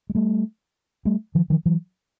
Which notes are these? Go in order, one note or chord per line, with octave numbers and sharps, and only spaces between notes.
G#3
G3 A3
G3 A3
D#3 F3
D#3 F3
E3 F#3